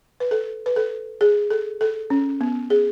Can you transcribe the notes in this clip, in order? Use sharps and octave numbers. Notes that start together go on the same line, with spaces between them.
B4
A4
B4
A4
G#4
A4
A4
C#4
B3
G#4